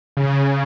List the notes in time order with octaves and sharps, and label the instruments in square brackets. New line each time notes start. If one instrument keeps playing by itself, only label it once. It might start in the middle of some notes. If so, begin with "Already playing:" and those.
[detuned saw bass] C#3